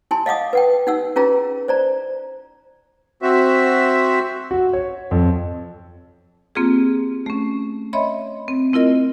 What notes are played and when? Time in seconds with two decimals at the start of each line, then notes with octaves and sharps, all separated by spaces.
0.11 E4 G#5 A5 C6
0.26 D#5 F5 F#5 D6 D#6
0.53 B4 F#5 G5
0.87 D#4 F#5 E6
1.16 C#4 E4 F4 G#4 B4 A#5
1.68 C5 D5 A#5
3.22 C4 F#4 E5
4.51 F#4
4.73 C#5
5.11 F2
6.55 A#3 C4 F4 G4 G#4
7.26 A3 C#4
7.93 C#5 D#5 E5 B5 C6
8.48 C4
8.73 A3 C4 E4 F4 A#4 D#5